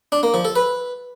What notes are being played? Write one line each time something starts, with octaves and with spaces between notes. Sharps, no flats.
D4
A#3
F3
A4
B4